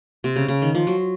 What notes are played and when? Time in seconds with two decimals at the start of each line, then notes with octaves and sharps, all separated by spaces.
0.24 C3
0.36 C#3
0.48 C#3
0.62 D#3
0.75 F3
0.87 F#3